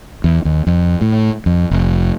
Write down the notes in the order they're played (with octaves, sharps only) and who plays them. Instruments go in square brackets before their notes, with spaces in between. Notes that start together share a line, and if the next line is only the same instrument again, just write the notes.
[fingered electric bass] E2
D#2
F2
A2
F2
F1